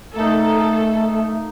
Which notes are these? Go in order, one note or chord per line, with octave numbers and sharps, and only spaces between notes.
A3 A#3 D#4 A4